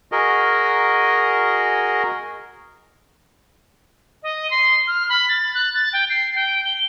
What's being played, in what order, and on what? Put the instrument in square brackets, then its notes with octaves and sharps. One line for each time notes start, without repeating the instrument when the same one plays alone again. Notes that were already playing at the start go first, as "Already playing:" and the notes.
[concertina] F#4 G#4 A#4 D#5
[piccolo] D#5
C6
F6
B5
A6
F#6
A6
G5
C7
G5
G7